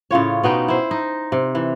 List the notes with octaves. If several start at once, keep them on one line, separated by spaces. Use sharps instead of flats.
A2 C#3 F4 C#5
B2 B3 D#4 G5
E4 C5
D#4
C3
E3